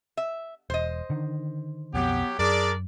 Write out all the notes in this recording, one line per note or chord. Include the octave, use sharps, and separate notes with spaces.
E5
E1 C5 D#5
D3 D#3
B1 F2 F#3 B3 G4
F#2 D4 G#4 A#4 D5